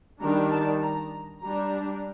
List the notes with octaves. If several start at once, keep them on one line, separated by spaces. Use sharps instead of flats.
D#3 G3 D4 A#5
A5
A#5
G3 D4 A#5